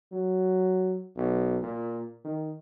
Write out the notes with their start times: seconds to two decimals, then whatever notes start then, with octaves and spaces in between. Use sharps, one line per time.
0.12 F#3
1.16 B1
1.63 A#2
2.24 D#3